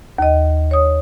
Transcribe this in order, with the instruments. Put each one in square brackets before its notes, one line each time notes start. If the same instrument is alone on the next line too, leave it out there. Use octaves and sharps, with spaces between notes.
[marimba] D#2 D#5
C#5 D#6